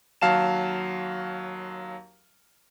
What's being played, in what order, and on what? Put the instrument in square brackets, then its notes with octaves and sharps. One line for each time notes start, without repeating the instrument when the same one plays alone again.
[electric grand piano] D#2 F#3 F5 A5 E7